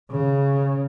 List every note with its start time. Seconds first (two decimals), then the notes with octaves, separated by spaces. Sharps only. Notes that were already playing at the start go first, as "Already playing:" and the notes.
0.11 C#3